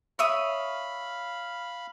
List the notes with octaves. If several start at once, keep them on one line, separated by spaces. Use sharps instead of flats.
C#5 E5 F5 B5 D#6